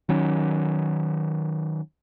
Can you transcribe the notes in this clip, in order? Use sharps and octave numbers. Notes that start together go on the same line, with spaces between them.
D#3 F#3 C#4